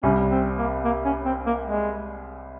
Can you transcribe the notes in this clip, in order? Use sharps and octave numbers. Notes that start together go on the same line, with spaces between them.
C2 C3 G3 C#4
C4
A#3
A#3
C#4
C4
A#3
G#3